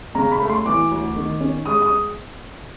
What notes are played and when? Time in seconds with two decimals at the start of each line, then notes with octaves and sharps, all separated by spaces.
0.15 C#3 A#5
0.32 B5
0.40 A3
0.49 C6
0.66 E3 D6
0.91 D2
1.16 D#3
1.40 C#4
1.66 G#3 D#6
1.82 D#6